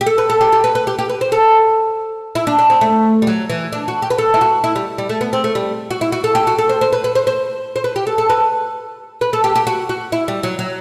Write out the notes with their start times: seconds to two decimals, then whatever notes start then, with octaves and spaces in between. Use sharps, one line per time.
0.01 G4
0.07 A4
0.18 B4
0.30 A4
0.41 G4
0.52 G4
0.64 B4
0.75 B4
0.87 G4
0.99 G4
1.09 B4
1.21 C5
1.32 A4
2.35 E4
2.47 D4
2.59 D4
2.70 C4
2.81 A3
3.22 G3
3.27 F#3
3.50 E3
3.73 D4
3.88 F#4
4.02 G4
4.10 B4
4.18 A4
4.34 E4
4.41 F#4
4.64 E4
4.76 G3
4.98 G3
5.09 A3
5.21 B3
5.33 C4
5.44 A3
5.55 G3
5.91 F#4
6.01 E4
6.12 F#4
6.24 A4
6.35 G4
6.47 F#4
6.58 A4
6.69 C5
6.81 C5
6.93 B4
7.04 B4
7.15 C5
7.27 C5
7.76 C5
7.84 B4
7.96 G4
8.07 A4
8.18 A4
8.29 B4
9.21 B4
9.33 A4
9.44 G4
9.56 G4
9.67 F#4
9.89 F#4
10.12 E4
10.28 G3
10.43 F#3
10.59 F#3